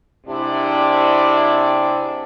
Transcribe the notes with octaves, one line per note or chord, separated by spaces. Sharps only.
G#2 C3 D4 E4 G4 D5